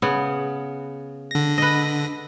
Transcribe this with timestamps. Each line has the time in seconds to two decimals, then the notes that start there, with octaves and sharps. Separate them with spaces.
0.02 C#3 B3
1.31 D3 A#6
1.58 B4 D#5